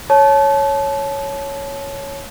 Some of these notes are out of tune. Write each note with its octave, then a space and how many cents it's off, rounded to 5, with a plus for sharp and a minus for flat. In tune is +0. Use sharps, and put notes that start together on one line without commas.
C#5 +0 A5 -25